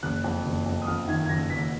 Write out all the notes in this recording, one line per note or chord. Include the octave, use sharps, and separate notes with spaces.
F#1 F#6
F2
F#1
F2
D#6
F2 F6
D#3 G#6
G#6
F#1 A#6
F#1 B6